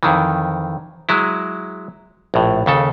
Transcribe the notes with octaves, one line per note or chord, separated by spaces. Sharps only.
F2 D#3 E3
F#3 G#3 E4
A#1 A2
D#2 C#3 A4